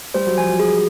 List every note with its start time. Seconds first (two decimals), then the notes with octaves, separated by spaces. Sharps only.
0.14 G3 C5
0.26 F#3
0.38 F3 G#5
0.50 F#3
0.59 G#4